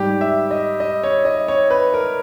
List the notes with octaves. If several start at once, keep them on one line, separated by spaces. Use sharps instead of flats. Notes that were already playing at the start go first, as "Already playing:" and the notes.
Already playing: G#2 G3 G4
E5
D#5
D#5
C#5
D#5
C#5
B4
A#4